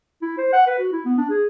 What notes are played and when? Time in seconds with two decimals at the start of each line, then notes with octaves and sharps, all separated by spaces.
0.22 E4
0.38 C5
0.53 F#5
0.67 B4
0.79 F#4
0.92 E4
1.05 B3
1.18 D4
1.30 G#4